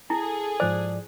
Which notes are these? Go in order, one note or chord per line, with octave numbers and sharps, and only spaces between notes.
E4 G#4 A4 A5
G#2 F3 C5 D5